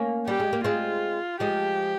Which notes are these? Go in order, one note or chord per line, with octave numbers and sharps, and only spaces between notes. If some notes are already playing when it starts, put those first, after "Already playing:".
Already playing: A#3 C#4
G3 G4
G#3
A#3
G#3 C4 F4
F3 G#3 G4